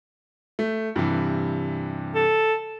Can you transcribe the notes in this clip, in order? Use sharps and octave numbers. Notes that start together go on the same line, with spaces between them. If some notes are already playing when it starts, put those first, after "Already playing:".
A3
G2 C3 E3
A4